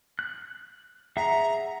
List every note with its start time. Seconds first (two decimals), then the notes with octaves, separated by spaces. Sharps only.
0.19 F#6
1.17 G#4 E5 F#5 A#5